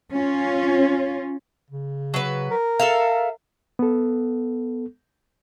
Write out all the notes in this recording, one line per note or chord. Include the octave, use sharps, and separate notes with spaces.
C#4 F4
C#3
F#3 B4
A#4
A4 E5 F5
B3 A4